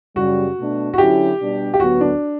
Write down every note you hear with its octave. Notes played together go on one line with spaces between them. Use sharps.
F#2 C#3 G3 F#4
B2 A3 D4
F#4
D3 F#3 C#4 E4 G4
B2 G3 D4
G4
D2 D3 F#3 B3 F#4
D4